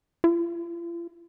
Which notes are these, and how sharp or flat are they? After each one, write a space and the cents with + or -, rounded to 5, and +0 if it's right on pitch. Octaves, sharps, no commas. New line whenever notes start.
F4 -45